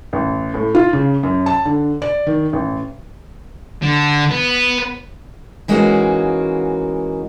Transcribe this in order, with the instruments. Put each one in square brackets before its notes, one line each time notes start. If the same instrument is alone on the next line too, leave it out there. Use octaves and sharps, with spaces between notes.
[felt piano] A1
A2
F4
C#3
F#2
A5
D3
D5
D#3
A1
[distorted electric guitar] D3
B3
[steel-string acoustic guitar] E3 G#3 A#3 C#4 D#4 F#4